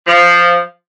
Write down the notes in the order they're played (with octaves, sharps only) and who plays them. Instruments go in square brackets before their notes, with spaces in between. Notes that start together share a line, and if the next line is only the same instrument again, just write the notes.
[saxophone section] F3